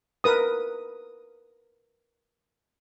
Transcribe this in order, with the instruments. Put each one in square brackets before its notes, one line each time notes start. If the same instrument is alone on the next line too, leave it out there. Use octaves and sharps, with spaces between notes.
[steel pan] A#4 B4 D#6